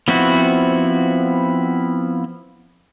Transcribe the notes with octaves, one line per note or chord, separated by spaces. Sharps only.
F3 B3 C4 E4 F#4